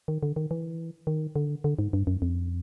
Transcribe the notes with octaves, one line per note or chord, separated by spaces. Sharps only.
D#3
D3
D#3
E3
D#3
D3
D3
G#2
G2
F#2
F2